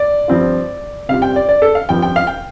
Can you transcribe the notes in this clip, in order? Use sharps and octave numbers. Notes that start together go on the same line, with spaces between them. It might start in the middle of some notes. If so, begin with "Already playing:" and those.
Already playing: D5
G2 F3 C4 F4
C3 G3 C4 F4 F5
G5
D5
D5
A4
F5
G2 F3 C4 F4 G5
G5
F5
G5